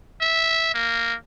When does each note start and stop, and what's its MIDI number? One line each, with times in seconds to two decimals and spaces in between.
0.21 0.72 76
0.74 1.15 58